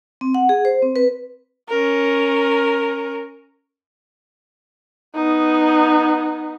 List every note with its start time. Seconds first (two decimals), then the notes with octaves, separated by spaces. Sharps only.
0.21 C4
0.34 F#5
0.49 G#4
0.65 C5
0.83 C4
0.96 B4
1.69 C#4 A#4
5.15 B3 D#4